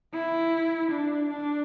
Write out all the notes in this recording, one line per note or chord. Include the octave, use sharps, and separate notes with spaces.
E4
D4
D4